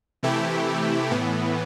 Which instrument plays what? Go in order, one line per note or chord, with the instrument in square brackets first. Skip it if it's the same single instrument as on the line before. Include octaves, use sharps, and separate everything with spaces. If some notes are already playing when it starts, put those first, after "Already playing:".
[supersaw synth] C3 E3 A3 E4 G4
A2 E3 B3